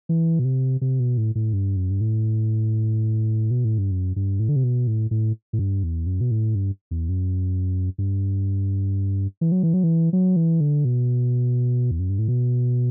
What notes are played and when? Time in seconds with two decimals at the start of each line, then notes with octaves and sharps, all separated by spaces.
0.09 E3
0.39 B2
0.45 C3
0.81 C3
1.00 B2
1.17 A2
1.35 A2
1.53 G2
1.77 F#2
1.90 G2
2.01 A2
3.51 B2
3.65 A2
3.78 G2
3.91 F#2
4.16 G2
4.40 A2
4.49 D3
4.56 C3
4.64 B2
4.87 A2
5.11 A2
5.53 A2
5.59 G2
5.83 E2
6.06 F#2
6.21 B2
6.31 A2
6.55 G2
6.91 E2
7.09 F#2
7.98 G2
9.41 E3
9.52 F#3
9.63 E3
9.73 F#3
9.83 E3
10.13 F#3
10.36 E3
10.60 D3
10.85 B2
11.91 E2
12.00 F#2
12.10 G2
12.19 A2
12.28 B2